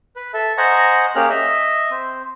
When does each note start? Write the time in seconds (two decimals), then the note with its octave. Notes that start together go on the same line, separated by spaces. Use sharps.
0.16 B4
0.34 A4 E5
0.58 C5 D#5 F#5 G#5 A#5 C#6
1.16 A#3 C#4 G4 G#4 F6 F#6
1.30 D#5 E5
1.91 C4